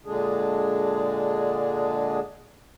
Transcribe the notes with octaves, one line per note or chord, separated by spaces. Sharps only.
A#2 D3 G#3 D4 G#4